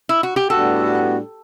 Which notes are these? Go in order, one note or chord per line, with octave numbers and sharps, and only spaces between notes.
E4
F#4
G4
A2 G3 B3 D4 F#4 A4